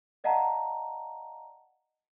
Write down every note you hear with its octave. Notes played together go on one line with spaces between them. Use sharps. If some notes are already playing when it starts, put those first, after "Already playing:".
D5 D#5 F5 F#5 A5 A#5